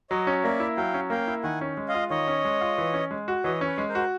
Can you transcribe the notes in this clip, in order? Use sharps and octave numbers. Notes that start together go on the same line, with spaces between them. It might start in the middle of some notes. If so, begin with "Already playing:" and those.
F#3 C#5 D#5
C#4
A#3 D5 E5
E4
F#3 F5 G5
C#4
A#3 F5 G5
E4
D#3 F#5 G#5
C#4
G#3
D#5 F5
F4
D#3 C#5 D#5
C#4
G#3
F4
E3
C#4
G#3
F#4
E3 C#5 D#5
C#4
B4 C#5
G#3
A#4 C5
F#4